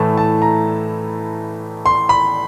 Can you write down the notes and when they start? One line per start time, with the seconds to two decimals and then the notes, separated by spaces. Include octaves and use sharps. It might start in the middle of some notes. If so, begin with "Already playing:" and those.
Already playing: A2 E3 A3 A5
0.17 A5
0.42 A#5
1.86 C6
2.09 B5